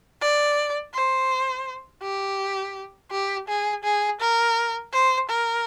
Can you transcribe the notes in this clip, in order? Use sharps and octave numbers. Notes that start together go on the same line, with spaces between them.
D5
C5
G4
G4
G#4
G#4
A#4
C5
A#4